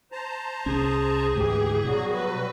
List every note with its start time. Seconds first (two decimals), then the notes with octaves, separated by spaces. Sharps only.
0.12 C5 A5 A#5
0.66 C2 C#4 G#4
1.35 D2 G#2 E3 G4
1.85 B2 F#3 G3 F#4
2.14 B4